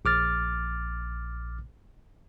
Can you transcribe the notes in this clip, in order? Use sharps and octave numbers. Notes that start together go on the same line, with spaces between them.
A#1 D6 F6 A6